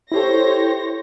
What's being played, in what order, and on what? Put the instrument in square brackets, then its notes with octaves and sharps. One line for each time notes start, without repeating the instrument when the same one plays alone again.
[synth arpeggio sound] E4 G4 A4 [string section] C5 C#5 A#6